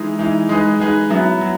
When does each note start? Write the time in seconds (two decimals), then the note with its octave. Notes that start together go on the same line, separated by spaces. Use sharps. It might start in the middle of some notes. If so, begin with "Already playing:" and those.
Already playing: E3 G#3 D#4
0.19 E3 G#3 D#4
0.49 G#3 D#4 G#4 B4
0.79 G#3 D#4 G#4 B4
1.10 F#3 B3 E4
1.41 F#3